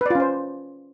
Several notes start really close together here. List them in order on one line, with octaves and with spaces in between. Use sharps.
B4 D5 F4 C#4 C5